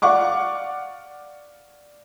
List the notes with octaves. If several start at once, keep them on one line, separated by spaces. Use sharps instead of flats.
D5 F5 F#5 C#6 D6